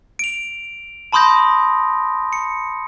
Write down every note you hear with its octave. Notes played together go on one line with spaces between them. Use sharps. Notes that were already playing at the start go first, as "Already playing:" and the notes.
D7 F7
A5 B5 C6 D#6 G6 A#6
C#7